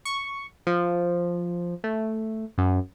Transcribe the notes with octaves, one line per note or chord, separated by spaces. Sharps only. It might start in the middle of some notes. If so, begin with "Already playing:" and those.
C#6
F3
A3
F#2